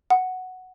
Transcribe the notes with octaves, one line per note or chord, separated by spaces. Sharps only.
F#5